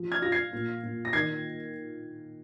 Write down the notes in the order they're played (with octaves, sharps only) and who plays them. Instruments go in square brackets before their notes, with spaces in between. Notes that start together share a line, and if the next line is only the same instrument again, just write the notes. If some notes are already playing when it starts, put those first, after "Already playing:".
Already playing: [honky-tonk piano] F3
[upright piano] F6 G#6
[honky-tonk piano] F4 [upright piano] A#6
[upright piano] G#6 C7
[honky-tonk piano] A#2
A#2
[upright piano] A#6
[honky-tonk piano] D#3 [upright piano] G#6 C7